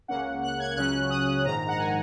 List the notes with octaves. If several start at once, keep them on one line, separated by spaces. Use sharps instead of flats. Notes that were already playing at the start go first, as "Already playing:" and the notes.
C#2 C#3 A#3 C#4 F#5
F#6
G#6
C#2 C#3 F#3 C#4 F#6
D#6
A#1 G#2 D#3 A#5
F#5
G#5